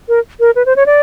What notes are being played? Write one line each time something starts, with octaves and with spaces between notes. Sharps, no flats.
A#4
A#4
B4
C5
C#5
D5